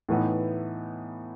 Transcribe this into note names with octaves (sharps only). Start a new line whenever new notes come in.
A2 E3 B3 D#4